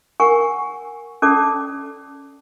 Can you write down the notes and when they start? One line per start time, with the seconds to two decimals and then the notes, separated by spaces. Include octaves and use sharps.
0.20 A#4 F#5 G#5 C#6
1.22 C#4 A4 D5 G5 A5 D6